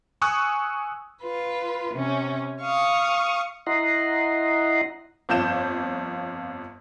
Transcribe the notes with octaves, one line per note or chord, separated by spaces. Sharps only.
G#5 C#6 D#6 E6 F#6
F4 B4
C3 C#4
F5 C#6 D#6
E4 D#5 F#5 A#5 C6
G1 F2 G6 E7